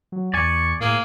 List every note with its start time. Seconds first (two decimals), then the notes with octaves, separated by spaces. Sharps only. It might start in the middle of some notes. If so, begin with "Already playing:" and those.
0.12 F#3
0.34 E2 D5 G#5 C#6
0.81 A2 A#3 G#4